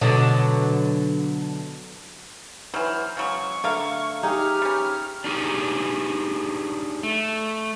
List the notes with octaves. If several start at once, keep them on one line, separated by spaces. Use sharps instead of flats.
B2 D3 F#3
E3 F#3 C5 F6
C#3 F#3 G#3 C#6
D3 A3 A#3 F5
D#4 G4 G#4 F6
G3 C#4
D4 D#4 G4 G#4
A3